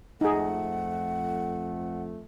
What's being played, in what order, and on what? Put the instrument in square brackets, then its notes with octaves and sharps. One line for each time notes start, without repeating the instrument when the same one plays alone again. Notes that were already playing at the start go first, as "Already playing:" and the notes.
[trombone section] F2 A3 [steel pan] D#4 G#4 [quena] F#5